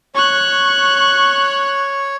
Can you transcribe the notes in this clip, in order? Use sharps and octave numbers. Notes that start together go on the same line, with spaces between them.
C#5 C#6 F#6